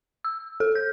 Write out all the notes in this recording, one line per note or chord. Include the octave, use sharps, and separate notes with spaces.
E6
A4
G6